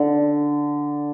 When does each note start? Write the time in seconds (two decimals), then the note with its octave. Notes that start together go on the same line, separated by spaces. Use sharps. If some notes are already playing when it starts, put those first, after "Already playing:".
Already playing: D3